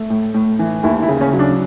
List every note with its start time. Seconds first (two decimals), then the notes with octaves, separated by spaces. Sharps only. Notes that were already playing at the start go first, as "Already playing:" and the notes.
Already playing: A3
0.10 A2
0.34 A2
0.59 E3
0.83 D#2 E4
1.02 E4
1.08 C#3
1.21 C#4
1.33 F#3
1.39 D4